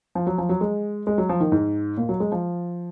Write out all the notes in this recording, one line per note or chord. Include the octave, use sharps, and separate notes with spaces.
F3
F#3
F3
F#3
G#3
G#3
F#3
F3
D#3
G#2
A#2
F#3
G#3
F3